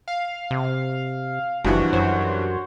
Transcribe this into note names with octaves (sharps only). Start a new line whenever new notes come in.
F5
C3
F#1 G2 E3 F3 F#4
F#2 F#4 C5 C#5